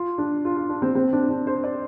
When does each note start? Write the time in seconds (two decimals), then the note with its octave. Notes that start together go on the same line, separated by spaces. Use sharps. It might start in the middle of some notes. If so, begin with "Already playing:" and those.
Already playing: F4
0.18 D4
0.45 F4
0.57 F4
0.69 D4
0.82 C4
0.95 C4
1.13 D4
1.29 D4
1.47 C5
1.64 D5